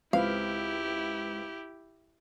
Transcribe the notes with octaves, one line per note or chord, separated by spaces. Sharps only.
C#2 C4 E4 G4 B4 F5